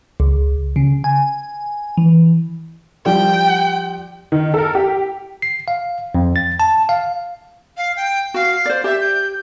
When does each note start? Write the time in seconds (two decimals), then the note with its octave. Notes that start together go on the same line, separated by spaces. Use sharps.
0.20 C#2
0.76 C#3
1.04 G#5
1.97 E3
3.06 F3 G3 G5
4.32 D#3
4.54 A4 A#4
4.75 G4
5.42 C7
5.68 F5
6.15 F2
6.36 A6
6.60 A5
6.89 F5
7.77 F5
7.96 G5
8.34 F#4 F5
8.65 C5 D5
8.84 G4 E5
9.00 G6